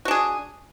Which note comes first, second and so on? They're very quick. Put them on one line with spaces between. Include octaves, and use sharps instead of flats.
F#4 D4 G#4